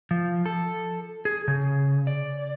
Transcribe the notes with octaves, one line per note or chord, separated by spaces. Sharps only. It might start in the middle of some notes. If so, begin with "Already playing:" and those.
F3
A4
G#4
C#3
D5